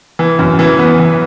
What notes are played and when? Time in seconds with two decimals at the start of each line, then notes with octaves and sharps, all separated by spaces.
0.19 E3
0.39 F#2
0.59 E3
0.79 B3
0.99 E3